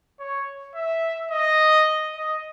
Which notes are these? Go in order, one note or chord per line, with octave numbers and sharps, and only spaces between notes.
C#5
E5
D#5
D#5